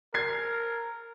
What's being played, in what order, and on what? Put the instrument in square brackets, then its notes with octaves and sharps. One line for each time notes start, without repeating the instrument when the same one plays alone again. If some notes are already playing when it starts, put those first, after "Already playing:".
[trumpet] A#4 [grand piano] G#6 C7